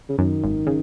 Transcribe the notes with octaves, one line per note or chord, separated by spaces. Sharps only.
C#3
F#2 D#3
G#1
C#3